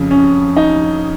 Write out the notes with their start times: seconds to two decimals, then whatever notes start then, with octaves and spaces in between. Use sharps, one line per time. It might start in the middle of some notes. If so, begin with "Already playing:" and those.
Already playing: F2 C#3
0.11 C#4
0.57 D#4